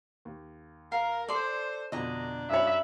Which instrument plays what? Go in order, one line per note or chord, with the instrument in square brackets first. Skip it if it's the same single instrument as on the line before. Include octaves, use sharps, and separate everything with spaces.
[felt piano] D#2
[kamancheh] A#4 [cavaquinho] F5
[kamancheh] A4 C5 [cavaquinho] D5 C6
[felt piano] F2 B2 D3 [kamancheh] D4 [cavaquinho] D#5 A#5
[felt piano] F#2 C#5 [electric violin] E5 B5